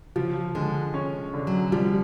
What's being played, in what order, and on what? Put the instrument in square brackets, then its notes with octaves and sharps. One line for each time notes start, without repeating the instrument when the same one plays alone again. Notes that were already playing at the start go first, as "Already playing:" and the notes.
[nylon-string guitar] C#3 [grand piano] F3
[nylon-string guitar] D3 [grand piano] G#3
[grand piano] C#4
D3
[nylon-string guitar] F#3
[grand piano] F3 [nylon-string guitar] G3